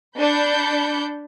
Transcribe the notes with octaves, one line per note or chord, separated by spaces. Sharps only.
D4 B5 G6 C#7